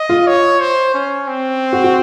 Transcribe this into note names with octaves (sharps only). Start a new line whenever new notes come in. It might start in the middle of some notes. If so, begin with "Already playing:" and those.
Already playing: D#5
F4
C#5
C5
C#4
C4
F#4
F#4